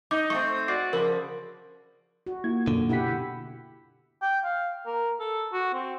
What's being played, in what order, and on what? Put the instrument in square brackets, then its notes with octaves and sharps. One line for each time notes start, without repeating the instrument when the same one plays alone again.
[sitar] D#4 [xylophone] D6
[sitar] A3 C4 [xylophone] C#6
[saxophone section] F#4 D5 [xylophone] C7
[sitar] C#3 F3 [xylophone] A#4
[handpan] F#4
[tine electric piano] A#3 F4 [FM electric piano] E4 G#6
[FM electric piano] F#2 B2 [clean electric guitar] D3
[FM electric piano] B2 B6 [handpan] E4 G4 F#5
[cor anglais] G5
F5
A#4
A4
F#4
C4